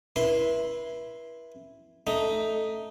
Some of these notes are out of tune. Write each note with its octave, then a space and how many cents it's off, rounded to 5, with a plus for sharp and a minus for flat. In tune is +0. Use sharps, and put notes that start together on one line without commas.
E4 +0 B4 -40 C6 +0
A3 +0 D#4 +0